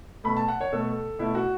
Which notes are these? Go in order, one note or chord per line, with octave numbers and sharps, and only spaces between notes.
B2 A3 B5
A5
F#5
C#5
B2 A3 A4
B2 A3 E4
F#4